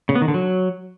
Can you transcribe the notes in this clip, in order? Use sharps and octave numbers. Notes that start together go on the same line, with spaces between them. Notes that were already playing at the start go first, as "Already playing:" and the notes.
C#3
B3
D#3
D3
F#3